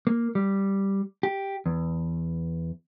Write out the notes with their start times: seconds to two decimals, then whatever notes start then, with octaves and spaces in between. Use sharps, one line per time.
0.07 A#3
0.35 G3
1.23 G4
1.66 E2